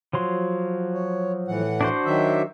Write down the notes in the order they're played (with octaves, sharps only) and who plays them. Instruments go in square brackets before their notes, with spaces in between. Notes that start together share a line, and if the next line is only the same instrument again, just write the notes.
[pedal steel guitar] F3 F#3 C6
[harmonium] C#5
A2 E3 F#5
[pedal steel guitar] D4 F#4 C5
[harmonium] D#3 F#3 E5